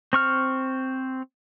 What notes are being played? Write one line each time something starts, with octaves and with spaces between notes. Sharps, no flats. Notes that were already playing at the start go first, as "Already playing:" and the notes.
C4 C#6 F6